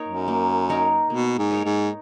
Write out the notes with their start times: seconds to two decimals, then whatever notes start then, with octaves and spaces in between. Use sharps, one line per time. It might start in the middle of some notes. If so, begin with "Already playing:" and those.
Already playing: A#3 D#4 A#4 C#5
0.08 F#2
0.28 A#3
0.69 D#4 A#4 C#5
1.10 B2 A#3
1.38 G#2
1.51 D#4 A#4 C#5
1.65 G#2